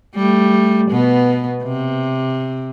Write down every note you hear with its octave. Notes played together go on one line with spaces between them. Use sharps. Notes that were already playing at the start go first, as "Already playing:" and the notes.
G3 A3
B2 B3
C3